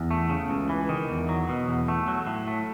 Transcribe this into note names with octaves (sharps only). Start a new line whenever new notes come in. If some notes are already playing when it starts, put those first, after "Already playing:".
Already playing: E2
A3
C#3
C#2
E3
D#3
E2
F#3
B2
E2
A3
F#3
A2
A3